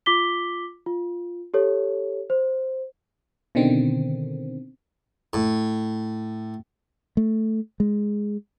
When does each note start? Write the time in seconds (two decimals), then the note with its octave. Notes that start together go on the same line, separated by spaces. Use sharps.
0.06 F4 D6 B6 G7
0.86 F4
1.54 G4 A4 C#5
2.30 C5
3.55 B2 D3 D#3 C4
5.33 A2
7.17 A3
7.80 G#3